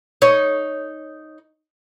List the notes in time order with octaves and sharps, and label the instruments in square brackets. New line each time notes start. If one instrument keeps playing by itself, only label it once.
[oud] D#4 C#5